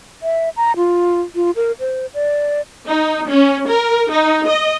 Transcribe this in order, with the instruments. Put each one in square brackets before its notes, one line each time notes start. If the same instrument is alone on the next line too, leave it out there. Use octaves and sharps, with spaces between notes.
[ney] E5
A#5
F4
F4
A#4
C5
D5
[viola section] D#4
C#4
A#4
D#4
D#5